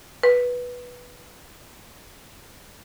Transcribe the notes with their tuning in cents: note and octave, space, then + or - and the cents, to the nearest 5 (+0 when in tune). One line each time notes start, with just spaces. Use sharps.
B4 -10